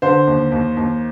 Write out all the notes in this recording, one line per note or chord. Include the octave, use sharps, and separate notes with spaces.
D3 C5
D#2
D#2
D#2